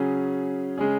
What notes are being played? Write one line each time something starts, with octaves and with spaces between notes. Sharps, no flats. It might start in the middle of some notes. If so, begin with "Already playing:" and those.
Already playing: C#3 F#3 C#4 G#4
C#3 G#3 C#4 G#4